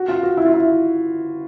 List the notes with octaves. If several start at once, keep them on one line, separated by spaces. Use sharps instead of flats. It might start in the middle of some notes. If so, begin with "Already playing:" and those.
Already playing: F#4
F4
F#4
E4
F4
E4